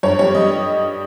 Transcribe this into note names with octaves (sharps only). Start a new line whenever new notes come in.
G2 C#5
G3 C#5
G3 D#5